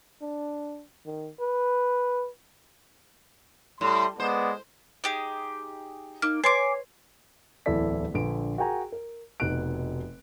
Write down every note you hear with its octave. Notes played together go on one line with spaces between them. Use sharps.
D4
D#3
B4
A2 G3 C6
G#3 B3 C5 D5
D#4 G4 G#4
A#3 D#4 F6
B4 C#5 G#5 C6 D6 C7
D1 E2 E4 A4 D5 B6
A#1 D3 B4 D7
F#4 G#4 A#4 G5 G#5 A#5
A#4
F1 B2 D#4 F#4 F#6 D7